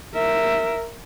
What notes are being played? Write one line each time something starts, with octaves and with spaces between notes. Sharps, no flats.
A#4 E5